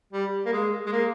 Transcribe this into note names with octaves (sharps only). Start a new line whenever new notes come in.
G3
A#3
G#3
G#3
A#3